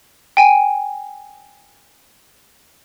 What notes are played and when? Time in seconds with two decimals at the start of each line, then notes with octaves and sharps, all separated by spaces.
0.37 G5 G#5